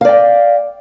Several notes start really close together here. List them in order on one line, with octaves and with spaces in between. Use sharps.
F5 D5 G5